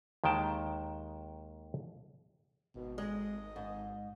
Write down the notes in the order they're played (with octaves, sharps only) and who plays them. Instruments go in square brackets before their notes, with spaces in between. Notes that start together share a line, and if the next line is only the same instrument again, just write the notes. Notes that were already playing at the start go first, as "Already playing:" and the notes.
[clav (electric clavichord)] D#2 D#3 G#3 G5 A5
[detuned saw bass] G#1 [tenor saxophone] B2
[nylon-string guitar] G#3 [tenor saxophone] D#5
[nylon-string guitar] G#2